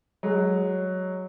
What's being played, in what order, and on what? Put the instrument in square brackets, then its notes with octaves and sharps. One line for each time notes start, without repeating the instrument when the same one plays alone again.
[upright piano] F#3 G#3